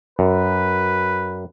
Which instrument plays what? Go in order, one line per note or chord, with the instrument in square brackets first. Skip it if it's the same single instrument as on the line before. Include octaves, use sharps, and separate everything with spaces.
[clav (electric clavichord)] F#2 [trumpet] B4